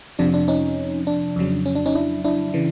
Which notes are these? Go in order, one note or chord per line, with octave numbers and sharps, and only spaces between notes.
F2 C3 F3 D4
D4
C#4 D#4
D4
F2 C#3 F#3
C#4
D4
C#4 D#4
D4 E4
D4 E4
C#3 E3